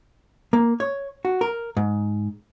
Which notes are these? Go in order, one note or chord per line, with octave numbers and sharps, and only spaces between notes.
A#3
C#5
F#4
A#4
G#2